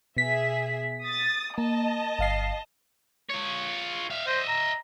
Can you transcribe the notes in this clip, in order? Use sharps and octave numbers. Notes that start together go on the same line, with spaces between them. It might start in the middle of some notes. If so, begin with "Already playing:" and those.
B2 G#4 E5 B6
D#6 A6
A#3 D#5 A5
G1 F5 C7
F4 C#5
E5 F5
C5 D#5 E5
A#5